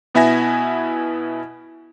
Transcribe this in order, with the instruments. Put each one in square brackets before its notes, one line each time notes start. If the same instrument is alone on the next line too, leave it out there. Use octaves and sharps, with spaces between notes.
[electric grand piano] B2 B3 E4 E5 G#5 A#6